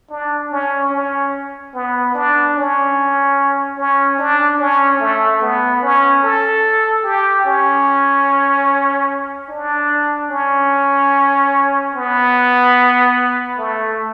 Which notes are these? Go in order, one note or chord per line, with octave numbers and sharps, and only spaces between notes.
D4
C#4
C#4
B3
D4
C#4
C#4
D4
C#4
A3
B3
C#4
A4
G4
C#4
D4
C#4
B3
A3